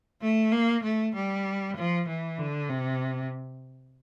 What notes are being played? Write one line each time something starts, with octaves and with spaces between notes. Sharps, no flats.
A3
A#3
A3
G3
F3
E3
D3
C3